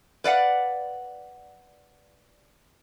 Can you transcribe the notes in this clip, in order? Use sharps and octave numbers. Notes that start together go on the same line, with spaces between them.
B4 D5 F5 F#5